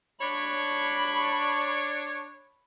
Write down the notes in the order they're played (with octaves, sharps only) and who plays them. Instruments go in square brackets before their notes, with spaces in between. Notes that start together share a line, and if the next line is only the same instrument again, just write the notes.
[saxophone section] D4 C#5 [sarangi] B5